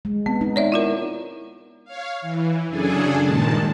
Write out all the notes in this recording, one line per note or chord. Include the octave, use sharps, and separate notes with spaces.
G#3
B3 C4
D#4
C#5 D5 E5
E4 F4 A#4
C#5 F5
E3
F#2 C#3 D4 G#4 A4 G#5
G2 A#2 D#3 G#3 A5